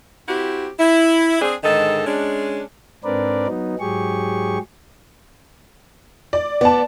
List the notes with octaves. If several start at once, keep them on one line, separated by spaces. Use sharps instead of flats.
C4 E4 F#4 G4
E4
C4 D4 G#4
G#2 D3 D#3 G#3 A4 D#5
G#3 C#4 D4
G#2 C4 D4 A#4 B4 D5
F#3 B3 D#4
G#2 F#3 G4 G#4 C#6
D5
B3 D5 A5